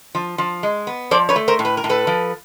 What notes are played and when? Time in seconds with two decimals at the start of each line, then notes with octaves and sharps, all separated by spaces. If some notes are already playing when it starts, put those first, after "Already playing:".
0.15 F3
0.38 F3
0.63 G#3
0.87 B3
1.11 F3 C5 D5
1.29 B4 C#5
1.36 A3
1.48 A#4 C5
1.59 A2
1.65 B4
1.77 A#4
1.84 A2
1.89 A4 B4
2.07 F3